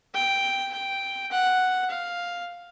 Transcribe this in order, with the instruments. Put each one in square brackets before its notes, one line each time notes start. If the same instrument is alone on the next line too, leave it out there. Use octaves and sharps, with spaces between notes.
[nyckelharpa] G5
G5
F#5
F5